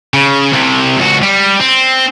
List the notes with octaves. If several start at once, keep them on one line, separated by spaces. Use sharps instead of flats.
C#3
C2 C3
C#2 F#4
G3
C4